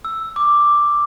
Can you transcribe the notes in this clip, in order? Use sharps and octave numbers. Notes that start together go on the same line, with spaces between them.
E6
D6